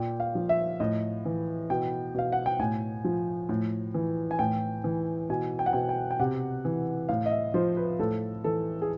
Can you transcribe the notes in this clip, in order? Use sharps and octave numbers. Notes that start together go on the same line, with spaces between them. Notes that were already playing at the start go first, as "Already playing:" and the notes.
Already playing: A#2 G5
F5
F3
E5
A2 D#5
E3
B2 G5
B2 F5
F#5
G5
A2 G#5
F3
A2
E3
G#5
A2 G5
E3
B2 G#5
G5
F#5
B2 G5
G5
G5
C3 F#5
E3
A2 F5
D#5
E5
F3 C5
B4
A2 A4
E3 A4
G#4